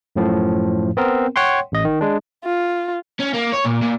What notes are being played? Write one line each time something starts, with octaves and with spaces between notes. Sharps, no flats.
F#2 A2 F3
B3 C4 A#4
C#5 F#5 G5 C6
A1 D#5
D#3
G#3 D4
F4
C#4
A#3
C#5
A#2
A#2